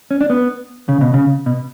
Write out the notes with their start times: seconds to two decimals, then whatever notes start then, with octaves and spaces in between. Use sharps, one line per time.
0.11 C#4
0.21 D4
0.30 B3
0.89 C#3
1.01 B2
1.14 C#3
1.46 B2